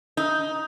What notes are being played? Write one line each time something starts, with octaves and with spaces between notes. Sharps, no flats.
D#4